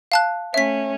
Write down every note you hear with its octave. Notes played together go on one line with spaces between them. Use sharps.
F5 A5 F#6
A3 C#4 E5 B6